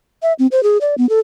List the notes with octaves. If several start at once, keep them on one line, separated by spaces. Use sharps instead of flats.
E5
C4
C5
G#4
D5
B3
A4